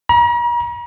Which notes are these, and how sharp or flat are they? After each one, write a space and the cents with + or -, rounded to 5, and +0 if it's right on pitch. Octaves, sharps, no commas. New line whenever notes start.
A#5 +45